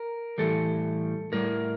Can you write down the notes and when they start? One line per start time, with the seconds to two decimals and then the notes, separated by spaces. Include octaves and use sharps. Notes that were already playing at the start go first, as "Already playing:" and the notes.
Already playing: A#4
0.38 A2 E3 G3 A4
1.32 A2 G3 A#4